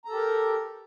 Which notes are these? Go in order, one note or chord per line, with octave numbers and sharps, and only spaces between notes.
G4 A4 A#4 A#5